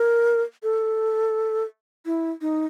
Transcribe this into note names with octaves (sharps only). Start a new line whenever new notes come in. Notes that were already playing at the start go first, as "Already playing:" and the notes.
Already playing: A#4
A4
E4
D#4